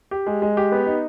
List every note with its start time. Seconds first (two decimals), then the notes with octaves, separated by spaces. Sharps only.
0.11 G4
0.26 G#3
0.42 G#3
0.57 G4
0.72 B3
0.86 D#4